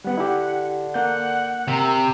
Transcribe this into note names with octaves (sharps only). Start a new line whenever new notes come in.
G3 B3 F#5
D3 E4 G4
A#3 F#5 G6
C3 A#4